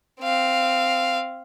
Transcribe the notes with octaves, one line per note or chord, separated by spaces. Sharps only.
C4 F5